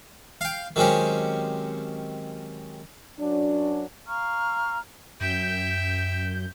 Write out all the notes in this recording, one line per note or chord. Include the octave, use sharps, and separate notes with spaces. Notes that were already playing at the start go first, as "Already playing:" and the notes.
F5 G5
D#3 F#3 G#3 C4 C#4 G4
F#2 F#3 D4
F5 A#5 C#6 F6
F#2 E5 G5 G6